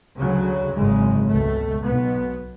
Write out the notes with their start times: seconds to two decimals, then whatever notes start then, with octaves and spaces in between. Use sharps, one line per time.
0.20 D2 C#3 F#3
0.74 G#1 F#2 C#3 G#3
1.29 C#2 B2 A3
1.84 B1 B2 B3